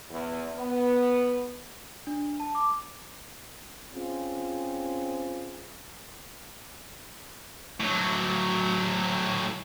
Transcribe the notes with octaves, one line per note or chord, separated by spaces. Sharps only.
E2
B3
D4
A5
D6
C4 C#4 F4 G#4
A2 F#3